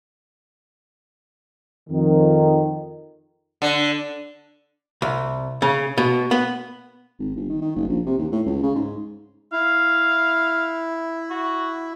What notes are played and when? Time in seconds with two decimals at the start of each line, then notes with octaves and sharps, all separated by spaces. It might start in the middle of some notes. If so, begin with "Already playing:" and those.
1.90 F2 D#3
3.62 D3
5.02 C2
5.62 C#3
5.98 B2
6.31 B3
7.19 G#1
7.36 G1
7.49 D#3
7.61 D#3
7.76 F#1
7.88 A#1
8.06 C3
8.18 D#2
8.32 A2
8.46 C#2
8.63 C#3
8.75 G#2
9.52 E4 F5
11.30 F#4